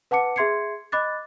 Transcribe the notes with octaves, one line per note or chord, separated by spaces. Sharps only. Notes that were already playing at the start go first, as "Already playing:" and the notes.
B4 F#5 A5 D6 C#7
G#4 E5 C6 G#6 C7 C#7
D#5 B5 D6 F#6 A6